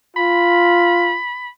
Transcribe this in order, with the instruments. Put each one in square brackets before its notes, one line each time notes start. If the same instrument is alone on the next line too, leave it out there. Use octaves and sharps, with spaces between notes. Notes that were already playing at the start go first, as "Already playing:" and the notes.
[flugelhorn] F4 [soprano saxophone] B5